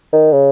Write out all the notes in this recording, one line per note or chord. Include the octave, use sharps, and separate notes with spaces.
D#3
C#3